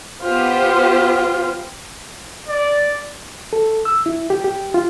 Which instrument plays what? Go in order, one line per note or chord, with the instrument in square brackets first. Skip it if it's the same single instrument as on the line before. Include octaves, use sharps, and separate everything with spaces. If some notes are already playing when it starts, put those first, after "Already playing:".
[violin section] B3 G4 C5 [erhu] F4
[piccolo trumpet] D5
[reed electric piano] A4
E6
E4
G4
G4
F4